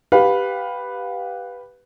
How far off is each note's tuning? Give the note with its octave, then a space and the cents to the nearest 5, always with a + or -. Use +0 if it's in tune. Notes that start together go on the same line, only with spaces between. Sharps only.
G4 +0 B4 +0 F5 +25